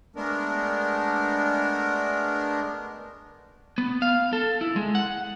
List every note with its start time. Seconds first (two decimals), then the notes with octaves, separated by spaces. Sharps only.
0.16 G#3 A3 B3 D4 A#4
3.78 B3
4.02 F5
4.33 A4
4.61 E4
4.76 G#3
4.95 F#5